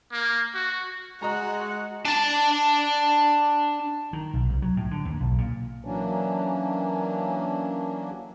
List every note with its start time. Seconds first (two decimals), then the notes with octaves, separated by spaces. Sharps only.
0.12 A#3
0.55 F#4
1.22 G#3 F#4 D#5 F#5 A#5
2.05 D4 A5
4.13 D#3
4.33 B1
4.50 C2
4.62 F#3
4.77 A2
4.91 D3
5.05 D#2
5.20 B1
5.38 A#2
5.85 E3 F#3 A#3 C#4 D4